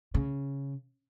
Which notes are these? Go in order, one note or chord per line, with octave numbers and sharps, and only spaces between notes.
C#3